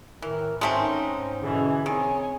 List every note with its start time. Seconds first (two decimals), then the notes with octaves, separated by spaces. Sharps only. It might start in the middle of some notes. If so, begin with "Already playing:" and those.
0.22 A2 D#3 E3 A#4
0.61 G#2 G#3 A3 C4 C#4 D#4 G#5
1.42 B2 D3 E3 C#4 G#4
1.86 D#3 C4 G#4 C#5 G#5